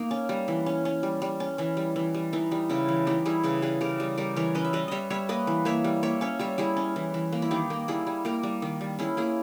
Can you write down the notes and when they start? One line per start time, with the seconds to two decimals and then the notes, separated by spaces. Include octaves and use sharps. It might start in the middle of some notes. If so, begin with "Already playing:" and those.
Already playing: A#3 D#4
0.11 C#4
0.29 G3
0.48 E3
0.66 C#4
0.85 C#4
1.03 G3
1.22 G3
1.40 C#4
1.58 E3 C#4
1.77 G3
1.96 E3
2.14 G3
2.33 E3 D#4
2.52 G3
2.69 C#3 C#4 E4
2.88 E3
3.07 E3 D#4 G4
3.25 G3 E4 G#4
3.43 C#3 G#4 B4
3.62 G3 G#4 B4
3.81 C#3 G4 A#4
4.00 G3
4.17 G3 G4 A#4
4.36 E3 A#4 C#5
4.55 C#4 B4 D#5
4.65 E5
4.73 G3 B4 D#5
4.88 G3 C#5 D#5 E5
5.10 G3 C#5 E5
5.29 A#3 B4 D#5
5.47 E3
5.65 A#3 C#5 E5
5.84 G3
6.03 A#3 C#5 E5
6.21 C#4 C#5 E5
6.39 G3 C#5 E5
6.58 G3 E4 G#4
6.77 C#4
6.96 E3
7.14 E3
7.32 A#3
7.42 E4
7.51 D#3 D#4 G4
7.70 A#3
7.88 G3 E4 G#4
8.07 G3
8.25 A#3 G4 A#4
8.43 G3
8.62 D#3
8.81 G3
8.99 C#4 E4 G#4
9.17 A#3 E4 G#4